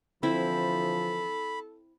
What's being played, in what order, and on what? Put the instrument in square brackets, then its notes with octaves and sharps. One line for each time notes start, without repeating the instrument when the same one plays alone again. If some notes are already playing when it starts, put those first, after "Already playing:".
[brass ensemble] D3 E3 F3 [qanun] C4 E4 [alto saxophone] A4 [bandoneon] B5